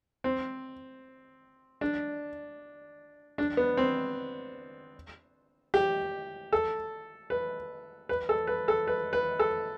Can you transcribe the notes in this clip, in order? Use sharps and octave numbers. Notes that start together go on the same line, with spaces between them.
C4
D4
D4
B3
C4
G4
A4
B4
B4
A4
B4
A4
B4
B4
A4